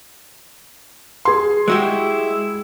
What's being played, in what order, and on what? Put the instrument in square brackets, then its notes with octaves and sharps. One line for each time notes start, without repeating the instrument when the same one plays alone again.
[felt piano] G#4 C6
[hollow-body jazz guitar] G#3 F#4 G4 [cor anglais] E4